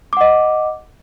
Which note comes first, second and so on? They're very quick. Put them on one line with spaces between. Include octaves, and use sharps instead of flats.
D6 F#5 D#5